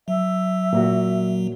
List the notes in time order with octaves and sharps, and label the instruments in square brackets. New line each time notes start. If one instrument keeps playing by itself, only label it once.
[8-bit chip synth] F#3 [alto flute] E5
[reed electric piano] A#2 A#3 F#4